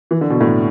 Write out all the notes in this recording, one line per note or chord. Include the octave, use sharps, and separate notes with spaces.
E3
D3
B2
A2